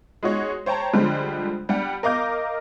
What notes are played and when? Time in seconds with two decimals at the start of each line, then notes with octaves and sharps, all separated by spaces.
0.23 G#3 D#4 F#4 C#5
0.66 C5 C#5 G5 A5 A#5
0.94 D3 F3 G3 G#3 C5
1.69 G3 D4 G4 F#5
2.03 A#4 D#5 F5 D6 G6